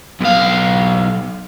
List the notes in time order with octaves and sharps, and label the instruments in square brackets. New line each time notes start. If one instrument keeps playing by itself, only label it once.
[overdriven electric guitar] B1 F5